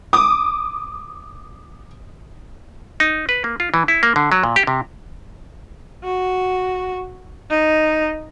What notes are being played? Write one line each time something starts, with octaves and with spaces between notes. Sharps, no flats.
D6 D#6
D#4
B4
A#3
F4
E3
E4
A#3
D3
F#3
A#2
G4
C3
F#4
D#4